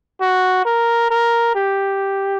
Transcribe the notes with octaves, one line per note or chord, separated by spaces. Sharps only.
F#4
A#4
A#4
G4